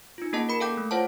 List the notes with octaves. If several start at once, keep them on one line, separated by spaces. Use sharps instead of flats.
D#4 F4
A#3 C#4 G#4 D#5 A5
A#4 B5 C#7
A4 F5 G5 D6 G6
A3
F4 A4 C5 C#5 F#5 A5